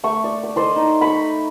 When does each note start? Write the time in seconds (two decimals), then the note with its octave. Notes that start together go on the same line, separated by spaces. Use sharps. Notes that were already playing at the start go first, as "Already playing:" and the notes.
0.04 A3 C#6
0.24 D5
0.44 D6
0.56 A4 C5 D5 D#5
0.76 D#4
1.01 B5 C#6